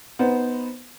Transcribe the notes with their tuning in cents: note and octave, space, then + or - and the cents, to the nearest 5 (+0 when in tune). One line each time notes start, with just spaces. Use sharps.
B3 +0 D#4 +0 C5 -10